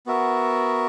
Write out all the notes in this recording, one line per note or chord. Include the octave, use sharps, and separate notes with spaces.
B3 F#4 A#4 E5